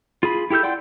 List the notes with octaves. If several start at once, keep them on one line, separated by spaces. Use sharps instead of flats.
F4 G#4 B5
E4 G4 A4 E6 G6
D5 F#5 G5 C6